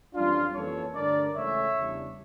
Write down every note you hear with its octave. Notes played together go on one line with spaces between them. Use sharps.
F2 E3 G3 C#4 D4 F4
F2 E3 A#3 C#4 A4 C#5
G2 D3 A3 D4 A#4 D5
C#2 C#3 E3 A3 C#4 C#5 E5
E2 C#3 E3 G3 D4